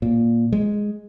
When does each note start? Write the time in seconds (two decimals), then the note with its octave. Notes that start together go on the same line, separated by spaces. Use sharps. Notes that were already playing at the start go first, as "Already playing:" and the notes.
0.02 A#2
0.52 G#3